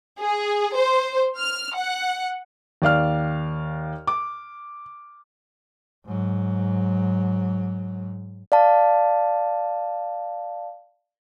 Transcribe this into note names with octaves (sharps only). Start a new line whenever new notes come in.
G#4
C5
F6
F#5
D#2 D5 F5 F6
D6
G#2 F#3
D5 F5 A5